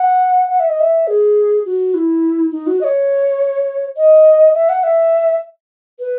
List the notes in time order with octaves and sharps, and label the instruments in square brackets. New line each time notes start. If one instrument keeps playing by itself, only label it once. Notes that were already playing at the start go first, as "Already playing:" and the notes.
Already playing: [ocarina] F#5
F#5
E5
D#5
E5
G#4
F#4
E4
D#4
F#4
D#5
C#5
D#5
E5
F#5
E5
B4